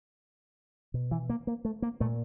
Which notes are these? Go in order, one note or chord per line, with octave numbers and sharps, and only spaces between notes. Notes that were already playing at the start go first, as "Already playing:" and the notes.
B2
E3
A#3
A#3
A3
A#3
A#2 A3